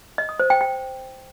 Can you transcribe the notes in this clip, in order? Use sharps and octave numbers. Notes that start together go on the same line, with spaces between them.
D#5
D#6
C5
G5
G5